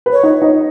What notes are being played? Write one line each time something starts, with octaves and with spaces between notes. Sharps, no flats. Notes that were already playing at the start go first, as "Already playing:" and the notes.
B4
C#5
D#4
D#4